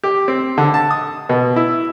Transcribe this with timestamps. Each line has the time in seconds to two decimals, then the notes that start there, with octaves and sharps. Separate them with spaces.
0.04 G4
0.28 C4
0.58 D3
0.74 A5
0.91 D#6
1.29 B2
1.56 E4